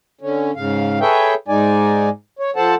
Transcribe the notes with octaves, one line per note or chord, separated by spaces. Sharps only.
D3 C#4
G#2 C#3 F5
G#4 A4 B4 C#5 E5 G5
G#2 G#3 D#4 D5 G#5
C#5
F3 A4 C5 F#5 A5